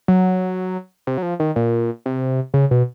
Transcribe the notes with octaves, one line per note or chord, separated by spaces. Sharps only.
F#3
C3
F#3
F3
D#3
A#2
C3
C#3
B2